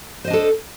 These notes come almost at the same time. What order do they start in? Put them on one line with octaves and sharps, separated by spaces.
C5 D#5 D4 A4